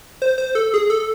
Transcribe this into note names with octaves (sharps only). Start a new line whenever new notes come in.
C5
C5
A4
G#4
A4